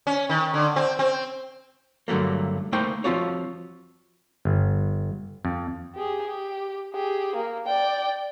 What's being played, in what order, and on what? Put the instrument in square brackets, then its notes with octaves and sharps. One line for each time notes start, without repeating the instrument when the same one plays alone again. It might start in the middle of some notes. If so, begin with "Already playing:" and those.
[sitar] C#4
D#3
D3
C4
C4
[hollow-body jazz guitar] G2 D3 F#3 A3 A#3
A3 A#3 D#4 C5 G5
F3 G3 C4 F4 F#4 C#5
[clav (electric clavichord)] G1
F2
[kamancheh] G4 G#4
G4
G4 G#4
A#3
D5 G5